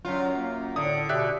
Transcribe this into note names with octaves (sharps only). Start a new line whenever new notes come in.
F#2 F#3 F4
A#3
A2 D3 D#6
B2 G4 E5 F#6